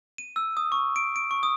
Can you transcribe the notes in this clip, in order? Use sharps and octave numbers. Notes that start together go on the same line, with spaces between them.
D#7
E6
D#6
C#6
D7
D7
C#6
D#6